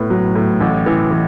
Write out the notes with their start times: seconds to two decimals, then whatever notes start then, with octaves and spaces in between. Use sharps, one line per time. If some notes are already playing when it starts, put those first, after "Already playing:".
Already playing: A2 B3
0.10 F#3
0.35 A2
0.61 A1
0.86 E3
1.11 E3